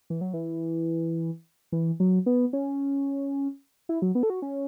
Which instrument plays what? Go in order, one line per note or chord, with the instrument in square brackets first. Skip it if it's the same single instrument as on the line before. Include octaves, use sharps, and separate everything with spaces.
[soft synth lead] E3
F#3
E3
E3
F#3
B3
C#4
E4
F#3
B3
A4
F#4
C#4